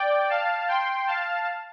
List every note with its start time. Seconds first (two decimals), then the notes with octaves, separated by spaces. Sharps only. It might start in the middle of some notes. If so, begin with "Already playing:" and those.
Already playing: D5 G5
0.30 F5 A5
0.68 G5 C6
1.07 F5 A5